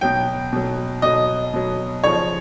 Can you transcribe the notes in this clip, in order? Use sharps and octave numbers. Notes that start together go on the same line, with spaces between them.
B2 F#3 G5
B2 F#3
B2 F#3 D#5
B2 F#3
C#3 F3 C#5